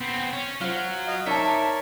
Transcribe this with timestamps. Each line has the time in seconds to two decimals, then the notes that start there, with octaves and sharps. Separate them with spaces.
0.01 B3 C4
0.33 C#4
0.61 F#3 F4 C5
1.07 D#5 F5
1.27 D#4 A#4 C#5 D5 E5 A5